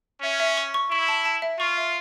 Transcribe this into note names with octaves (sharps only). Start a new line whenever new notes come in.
C#4 E5
E5
C#6
C#6
E4 C#6
A5
A5
E5
F4 C#6
E5